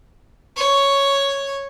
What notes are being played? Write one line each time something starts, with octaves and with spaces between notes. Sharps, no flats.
C#5